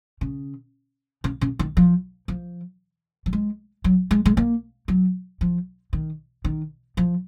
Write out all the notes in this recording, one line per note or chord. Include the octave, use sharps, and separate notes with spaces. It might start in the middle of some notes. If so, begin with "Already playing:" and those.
C#3
C#3
C#3
D#3
F3
F3
F#3
G#3
F#3
G#3
G#3
A#3
F#3
F3
D#3
D#3
F3